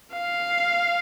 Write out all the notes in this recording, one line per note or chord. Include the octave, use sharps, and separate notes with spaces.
F5